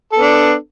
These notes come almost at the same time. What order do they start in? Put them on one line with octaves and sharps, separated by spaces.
A4 B3 D4